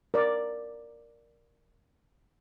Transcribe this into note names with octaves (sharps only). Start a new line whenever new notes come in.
A#4 D5